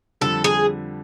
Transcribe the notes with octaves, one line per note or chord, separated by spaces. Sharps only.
F2 D3 G3 A4
G#4